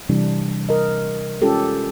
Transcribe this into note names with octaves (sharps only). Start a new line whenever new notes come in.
C3 E3 G3 D4
A#4 D#5
G#3 C#4 F4 G4 A4